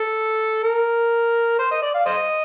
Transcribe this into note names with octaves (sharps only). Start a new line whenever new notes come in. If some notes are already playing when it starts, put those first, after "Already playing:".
Already playing: A4
A#4
C5
D#5
D5
F5
C5 D#5